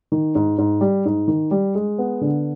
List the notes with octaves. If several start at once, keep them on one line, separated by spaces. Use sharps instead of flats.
D#3
G#2
G#2
G3
G#2
D#3
G3
G#3
B3
D3